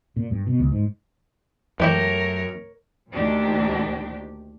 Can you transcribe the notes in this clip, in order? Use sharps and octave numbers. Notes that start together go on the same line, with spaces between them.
A#2
G2
B2
C#2
G#2
F#2 E3 G#3 A3 E4 G4 A#4 C#5
D2 A#2 D#3 D4 G4